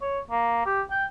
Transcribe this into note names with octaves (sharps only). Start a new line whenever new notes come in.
C#5
A#3
G4
G5